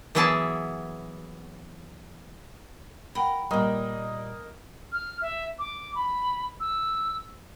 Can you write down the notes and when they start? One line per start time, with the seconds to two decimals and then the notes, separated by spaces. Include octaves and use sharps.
0.15 E3 F#3 B3 E4 G#4 A5
3.15 A#4 F#5 G5 B5
3.51 A#2 G3 A#3 D#5
4.92 F6
5.22 E5
5.59 D6
5.95 B5
6.60 E6